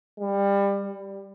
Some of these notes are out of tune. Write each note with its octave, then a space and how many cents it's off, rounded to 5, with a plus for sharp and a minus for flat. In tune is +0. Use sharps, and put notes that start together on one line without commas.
G3 +25
G3 +0